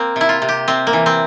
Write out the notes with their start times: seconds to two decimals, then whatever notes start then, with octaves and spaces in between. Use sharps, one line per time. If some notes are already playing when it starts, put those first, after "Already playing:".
Already playing: A#3 C4
0.16 C3 E4
0.29 F4
0.42 C3
0.49 G4
0.68 C3 C4
0.87 A#3
0.93 E3
1.06 C4